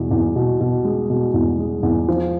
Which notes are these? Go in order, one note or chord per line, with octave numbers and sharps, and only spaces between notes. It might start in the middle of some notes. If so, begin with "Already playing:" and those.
Already playing: E2 B2
E2
B2
B2
G#3
B2
E2
G#3
E2
F3